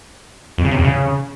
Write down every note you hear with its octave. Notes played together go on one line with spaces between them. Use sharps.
F2
C#3
C3
E2
C#3